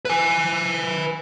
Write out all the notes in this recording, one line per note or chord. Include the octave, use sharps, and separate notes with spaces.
B4 G#5